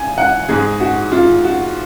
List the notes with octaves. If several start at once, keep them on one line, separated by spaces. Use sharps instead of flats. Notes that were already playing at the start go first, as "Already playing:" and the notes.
Already playing: G#5
F#5
G#2 G#3 G#4
F#4
F4
F#4